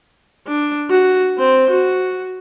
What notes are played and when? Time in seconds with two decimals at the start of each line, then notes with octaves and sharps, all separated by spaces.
0.47 D4
0.90 F#4
1.38 C4 C5
1.70 F#4